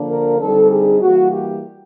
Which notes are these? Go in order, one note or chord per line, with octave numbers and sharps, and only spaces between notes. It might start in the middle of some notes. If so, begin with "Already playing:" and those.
Already playing: D3 F3 A#3 D4
A#4
D3 G3 C4 D#4 A4
G#4
E3 G3 A#3 F#4
G4